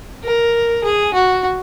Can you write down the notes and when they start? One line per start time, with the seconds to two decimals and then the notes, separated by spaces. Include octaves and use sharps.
0.24 A#4
0.84 G#4
1.13 F#4